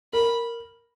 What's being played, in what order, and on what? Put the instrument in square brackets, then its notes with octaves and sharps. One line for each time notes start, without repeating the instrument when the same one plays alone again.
[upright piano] A#4 [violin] B5